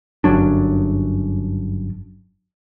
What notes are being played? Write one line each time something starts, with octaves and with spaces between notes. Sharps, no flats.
G1 F#2 F#3 D4